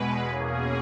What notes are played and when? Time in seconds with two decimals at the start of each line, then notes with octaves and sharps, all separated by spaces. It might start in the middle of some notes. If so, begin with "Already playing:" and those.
Already playing: E2 B2 G#3 B4
0.31 E2 B2 A#3 C#4 G#4